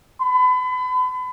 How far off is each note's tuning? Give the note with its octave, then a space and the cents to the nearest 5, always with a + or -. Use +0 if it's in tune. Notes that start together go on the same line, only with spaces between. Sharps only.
B5 +35